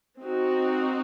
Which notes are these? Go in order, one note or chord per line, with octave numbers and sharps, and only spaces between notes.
C4 D#4 F#4